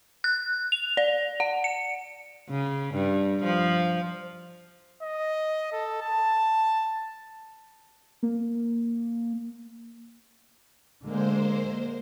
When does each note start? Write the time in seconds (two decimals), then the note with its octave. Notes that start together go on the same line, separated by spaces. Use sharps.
0.24 F#6
0.72 F7
0.97 D5
1.40 F#5
1.64 C#7
2.49 C#3
2.94 G2
3.44 F3
5.02 D#5
5.72 A4
6.02 A5
8.23 A#3
11.04 D3 G#3 A#3 C5